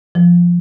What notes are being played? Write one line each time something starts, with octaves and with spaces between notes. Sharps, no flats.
F3